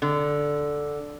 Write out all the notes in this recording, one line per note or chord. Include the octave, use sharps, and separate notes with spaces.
D3